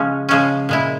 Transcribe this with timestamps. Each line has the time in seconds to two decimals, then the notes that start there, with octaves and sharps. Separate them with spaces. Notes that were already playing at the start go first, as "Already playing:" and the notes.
Already playing: C#3 F3 G#3 C#4
0.29 C#3 F3 G#3 C#4
0.69 A#2 G#3 E4